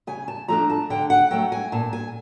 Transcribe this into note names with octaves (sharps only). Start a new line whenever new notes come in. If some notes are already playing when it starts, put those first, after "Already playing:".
C#3 G#5
A5
F3 A3 D4 A#5
A5
D3 G5
F#5
F#3 A3 G5
G#5
A#2 A5
G#5